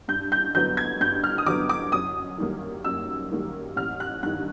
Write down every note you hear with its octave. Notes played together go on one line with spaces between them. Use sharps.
G2 G6
G6
D3 F#3 B3 G6
G#6
G2 G6
F6
D#6
D3 F#3 B3 D6
D6
F#2 D#6
D#3 G3 A#3
F#2 E6
D#3 G3 A#3
A1 F6
F#6
G2 D#3 F#6